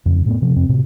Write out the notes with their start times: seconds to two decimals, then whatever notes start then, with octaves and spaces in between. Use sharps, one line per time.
0.06 F2 C#3
0.26 A2 A3 B3
0.42 C3 F3
0.56 F2 C4
0.69 A2 C3